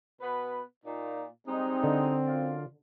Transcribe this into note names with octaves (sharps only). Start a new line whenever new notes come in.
B2 B3 B4
A#2 D#4
G3 G#3 C4 D#4
D3
F#2 D4 F4